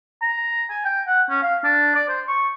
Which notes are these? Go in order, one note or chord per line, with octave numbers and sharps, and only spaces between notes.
A#5
G#5
G5
F#5
C#4
F5
D4
D5
C5
C#6